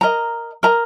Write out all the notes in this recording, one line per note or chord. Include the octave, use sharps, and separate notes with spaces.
A#4 D#5 A#5
A#4 D#5 A#5